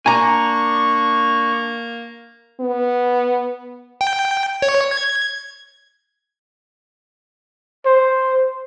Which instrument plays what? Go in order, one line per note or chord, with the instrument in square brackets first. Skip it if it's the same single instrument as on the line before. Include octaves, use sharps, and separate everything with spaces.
[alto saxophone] A#3 [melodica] D4 C#6 [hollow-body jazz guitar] G#5 A#5
[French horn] B3
[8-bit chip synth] G5
C#5
G#6
[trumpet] C5